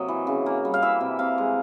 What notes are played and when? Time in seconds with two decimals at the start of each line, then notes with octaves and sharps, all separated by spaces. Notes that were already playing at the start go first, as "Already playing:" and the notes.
Already playing: C3 F#3 A#3 D#5
0.08 E3
0.27 C#3
0.46 A#3
0.65 G3
0.74 F5
0.82 E3 E5
1.00 C3
1.19 C3 F5
1.38 G#3